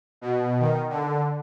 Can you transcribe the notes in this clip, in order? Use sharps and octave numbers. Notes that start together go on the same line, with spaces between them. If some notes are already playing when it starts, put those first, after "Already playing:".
B2
D#3
D3